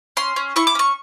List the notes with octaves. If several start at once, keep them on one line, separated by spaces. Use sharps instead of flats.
C#4 C6
C#4
E4 C#6
D6
C#4 C#6